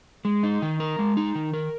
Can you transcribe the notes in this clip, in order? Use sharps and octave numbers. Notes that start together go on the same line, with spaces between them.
G#3
D#4
D#3
A#4
G#3
D#4
D#3
A#4